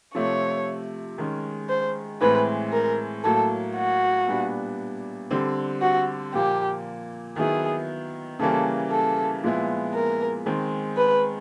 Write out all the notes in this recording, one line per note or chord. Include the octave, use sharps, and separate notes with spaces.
C3 F3 A3 C#5
D#3 G#3 C#4
C5
A2 E3 G#3 C4 B4
A#4
A2 F#3 A#3 A4
F#4
A#2 G3 B3 D4
D3 G3 C4
F#4
A#2 F3 A#3 G4
D#3 F#3 B3 E4 G#4
C#3 E3 G3 A#3 C#4 A4
A4
A#2 F3 G#3 B3 E4
A#4
D#3 G#3 C4
B4